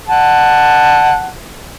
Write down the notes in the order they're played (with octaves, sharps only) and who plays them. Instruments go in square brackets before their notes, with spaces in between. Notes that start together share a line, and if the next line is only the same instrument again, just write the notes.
[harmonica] F#5 A5